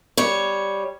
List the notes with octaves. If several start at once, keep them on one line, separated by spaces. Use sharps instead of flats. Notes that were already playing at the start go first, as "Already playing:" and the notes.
G3 C#5